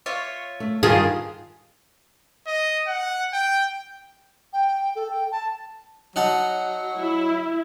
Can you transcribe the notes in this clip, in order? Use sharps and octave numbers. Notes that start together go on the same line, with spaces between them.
F4 C#5 E5
A3
G2 D#3 F4 G4 G#4 F5 A5
D#5
F#5
G5
G5
A4
G5
A5
F#3 D#4 F#5 A5
E4